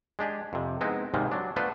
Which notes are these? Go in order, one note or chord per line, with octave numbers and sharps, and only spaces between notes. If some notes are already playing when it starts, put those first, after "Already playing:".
G#3 D4 G4 G#4
F2 C3
G#3 B3 C4 D#4 E4
G#2 C3 D#3 G3 G#3 A#3
F#3 D4
A3 B3 D4 F4 B4 C5